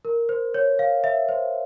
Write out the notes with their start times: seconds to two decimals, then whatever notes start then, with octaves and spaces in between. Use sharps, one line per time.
0.05 A#4
0.29 C5
0.54 C#5
0.79 F5
1.04 E5
1.29 C5